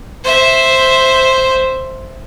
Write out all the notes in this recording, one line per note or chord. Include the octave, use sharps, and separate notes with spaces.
C5 E5